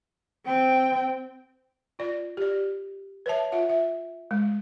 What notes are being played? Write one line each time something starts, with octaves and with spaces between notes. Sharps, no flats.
C4 G5
F4 D5
G4 D5
B4 C#5 E5 A5
F4 E5 F#5
E5
G#3